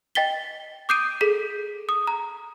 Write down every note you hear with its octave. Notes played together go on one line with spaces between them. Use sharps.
D#5 G5 A6 B6 G7
D6 D#6 G6 C7 D7 D#7
G#4 A4 B6
D#6
A#5